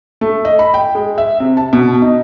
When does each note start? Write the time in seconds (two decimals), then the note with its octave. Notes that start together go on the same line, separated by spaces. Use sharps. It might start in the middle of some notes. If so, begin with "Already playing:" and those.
0.21 A3
0.45 D#5
0.59 B5
0.74 G5
0.95 G#3
1.18 E5
1.40 C3
1.57 A5
1.73 B2
2.02 D#4